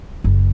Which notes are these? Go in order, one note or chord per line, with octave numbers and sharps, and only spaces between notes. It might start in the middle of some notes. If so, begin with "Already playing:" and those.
F#1